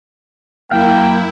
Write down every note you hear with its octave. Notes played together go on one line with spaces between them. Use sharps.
F#2 F#3 A#3 E4 F5 G5